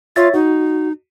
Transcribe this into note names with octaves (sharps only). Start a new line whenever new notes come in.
F4 C#5 E5 A6
D#4 F#4